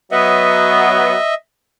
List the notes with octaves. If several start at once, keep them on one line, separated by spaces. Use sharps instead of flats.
F#3 B3 D#5 E5